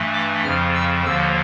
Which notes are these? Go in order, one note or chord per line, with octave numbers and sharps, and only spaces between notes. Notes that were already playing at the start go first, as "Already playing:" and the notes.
Already playing: G2 E3 A3
D6
F2 C#3 F3 F6
E6
D#2 D3 F3 A#3 E6